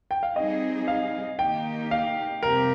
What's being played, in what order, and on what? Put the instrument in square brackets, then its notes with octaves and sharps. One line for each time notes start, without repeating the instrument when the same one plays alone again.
[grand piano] G5
F5
[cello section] G3 C4 D#4 G#4 [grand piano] D#5
[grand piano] F5
[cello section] D#3 A#3 D#4 G4 [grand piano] G5
[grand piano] F5
[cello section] F2 C3 G3 C4 G4 [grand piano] A#4